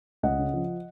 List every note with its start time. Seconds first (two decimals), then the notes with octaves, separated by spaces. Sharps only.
0.23 C#2 D#5 F#5
0.39 C#3
0.54 F3